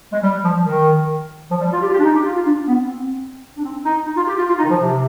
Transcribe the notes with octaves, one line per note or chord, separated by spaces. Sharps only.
G#3
G3
F3
D#3
F3
G3
F4
G4
F4
G4
D4
D#4
G4
F4
F4
D4
B3
C4
D4
C4
D#4
D#4
F4
G4
F4
F4
D#4
D#3
F3
C3